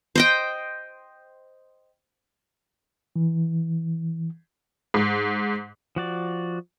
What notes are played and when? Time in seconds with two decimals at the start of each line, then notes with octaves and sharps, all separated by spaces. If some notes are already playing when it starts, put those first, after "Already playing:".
0.16 C5 D#5 G5
3.16 E3
4.94 G#2
5.96 F3 F#4 D5